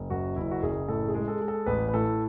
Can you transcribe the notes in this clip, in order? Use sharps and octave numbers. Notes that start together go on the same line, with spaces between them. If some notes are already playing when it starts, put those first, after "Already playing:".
Already playing: F#1
F#2 F#4
F#1 E4
F#4
F#1 G#4
A2 A4
G#4
G#3
A4
G#3
A4
A1 B4
B4
A2 A4